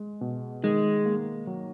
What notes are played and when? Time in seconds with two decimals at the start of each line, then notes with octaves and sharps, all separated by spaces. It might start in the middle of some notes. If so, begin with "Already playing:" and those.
Already playing: G#3
0.21 B2
0.63 D#3 G#3
1.05 A#3
1.47 F#3